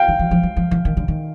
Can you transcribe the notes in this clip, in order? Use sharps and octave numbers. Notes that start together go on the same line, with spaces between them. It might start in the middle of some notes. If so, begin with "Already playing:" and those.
Already playing: F5 G5
D#3
E3
F3
F#3
F3
E3
D#3
D3
D#3